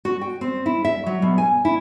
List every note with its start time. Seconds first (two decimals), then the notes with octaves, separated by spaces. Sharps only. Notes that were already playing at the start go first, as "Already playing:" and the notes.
0.05 F#4
0.21 G5
0.41 C4
0.66 E4
0.85 E5
1.06 F#3
1.22 B2
1.38 G#5
1.65 E4